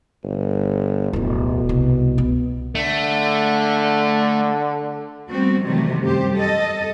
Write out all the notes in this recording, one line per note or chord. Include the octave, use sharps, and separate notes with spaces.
G1
D1 F2 B2
C2
B3
D3 A3
G3 A3 B3 C4 F#4
C3 D#3 E3 F#3 G3 A3
F#2 G3 G4 C5
A4 D#5